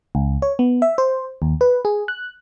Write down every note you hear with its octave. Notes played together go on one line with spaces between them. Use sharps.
C#2
C#5
B3
E5
C5
D#2
B4
G#4
F#6